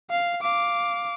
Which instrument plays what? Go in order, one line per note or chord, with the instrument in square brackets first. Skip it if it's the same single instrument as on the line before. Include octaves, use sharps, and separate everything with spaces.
[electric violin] F5
F5 D6